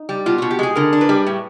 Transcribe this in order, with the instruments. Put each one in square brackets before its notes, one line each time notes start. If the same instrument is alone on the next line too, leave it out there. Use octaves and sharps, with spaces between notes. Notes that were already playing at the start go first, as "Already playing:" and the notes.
Already playing: [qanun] D#4
[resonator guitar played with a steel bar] G3
[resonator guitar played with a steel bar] B2 [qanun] F4
[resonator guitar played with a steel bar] B2 [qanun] F#4
[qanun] G4
[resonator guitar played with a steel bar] G#3 [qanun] G#4
[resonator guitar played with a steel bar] D3 [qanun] A#4
[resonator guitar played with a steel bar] D4
[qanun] B4
[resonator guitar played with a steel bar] G3
A2